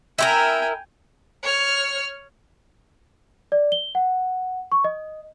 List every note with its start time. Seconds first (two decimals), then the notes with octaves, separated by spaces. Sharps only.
0.19 E4 F4 A#4 G5 G#5
1.43 C#5 F6
3.52 D5
3.72 G7
3.95 F#5
4.72 C#6
4.84 D#5